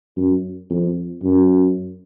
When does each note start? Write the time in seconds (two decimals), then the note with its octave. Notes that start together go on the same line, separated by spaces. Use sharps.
0.17 F#2
0.70 F2
1.23 F#2